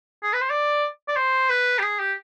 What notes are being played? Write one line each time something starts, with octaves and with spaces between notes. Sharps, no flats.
G#4
B4
C5
D5
D5
C5
B4
G4
G#4
G4